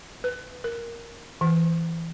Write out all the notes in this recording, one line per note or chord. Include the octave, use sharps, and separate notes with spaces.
B4
A#4
E3